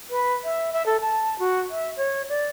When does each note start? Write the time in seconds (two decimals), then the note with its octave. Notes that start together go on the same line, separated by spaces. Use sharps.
0.10 B4
0.44 E5
0.73 E5
0.86 A4
1.01 A5
1.39 F#4
1.70 E5
1.97 C#5
2.29 D5